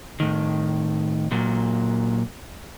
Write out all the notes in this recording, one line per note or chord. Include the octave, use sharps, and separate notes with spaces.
A2 D#3
A#2 F#3